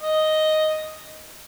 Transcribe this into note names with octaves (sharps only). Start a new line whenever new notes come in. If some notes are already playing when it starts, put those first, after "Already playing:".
D#5